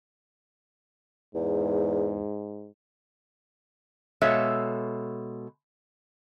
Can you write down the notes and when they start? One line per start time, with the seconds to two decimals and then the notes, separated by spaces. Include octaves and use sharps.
1.35 E2 G#2
4.22 B2 G#3 A4 C#5 E5 F5